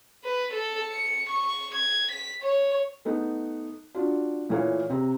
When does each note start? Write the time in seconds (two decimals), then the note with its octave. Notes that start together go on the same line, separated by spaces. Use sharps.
0.24 B4
0.53 A4
0.92 C#7
1.30 C#6
1.75 G#6
2.12 B6
2.43 C#5
3.05 A3 B3 D#4
3.95 D4 F4 F#4
4.49 A#2 E3 A3 C#5 F5
4.90 C3 C4 A#5